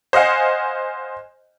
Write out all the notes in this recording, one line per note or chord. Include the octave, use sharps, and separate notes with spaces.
C5 D#5 F5 F#5 G#5